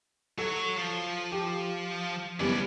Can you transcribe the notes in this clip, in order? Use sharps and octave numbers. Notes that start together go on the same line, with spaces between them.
F#3 A4 C#5
F3
G4
F#1 G3 B3 C#4 D5